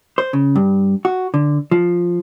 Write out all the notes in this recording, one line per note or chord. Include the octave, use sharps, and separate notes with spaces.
C5
C#3
G2
F#4
D3
F3